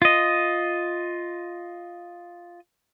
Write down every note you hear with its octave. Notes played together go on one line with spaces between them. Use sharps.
F4 D#5